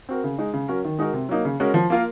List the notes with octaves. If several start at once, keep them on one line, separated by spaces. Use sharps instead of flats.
C4 F#4 A#4
C#3
G#3 D#4
C#3
F#3 C#4 F#4 A#4
D#3
G#3 D#4 F#4 A#4
C3
F#3 A#3 D#4
C#3
G#3 C#4 F#4 A#4
F3
A#3 F4 A#4